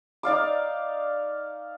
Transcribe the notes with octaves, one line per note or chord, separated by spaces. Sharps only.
D#4 D5 F5 D6